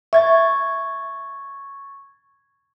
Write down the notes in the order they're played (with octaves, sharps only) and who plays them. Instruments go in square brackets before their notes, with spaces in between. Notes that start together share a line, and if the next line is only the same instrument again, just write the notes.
[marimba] E5 [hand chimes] C#6 G#6 A6